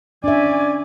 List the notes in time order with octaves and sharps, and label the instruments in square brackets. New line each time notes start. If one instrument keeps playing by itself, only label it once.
[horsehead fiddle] C#4 G#5 [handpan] D4 E5 [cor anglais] D5